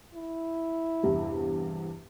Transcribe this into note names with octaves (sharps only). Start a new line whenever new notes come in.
E4
E2 G2 C3